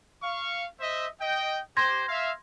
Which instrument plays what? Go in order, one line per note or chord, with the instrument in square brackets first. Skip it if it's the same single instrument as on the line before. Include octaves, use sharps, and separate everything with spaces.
[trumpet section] F5 C#6
C5 D#5 E5
D#5 G5
[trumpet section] G4 C5 [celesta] C6 G#6 A#6
[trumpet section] E5 F5